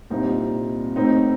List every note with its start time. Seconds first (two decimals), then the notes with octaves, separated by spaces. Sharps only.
0.10 C2 A#2 G3 C4 D#4
0.96 A2 A3 C4 D#4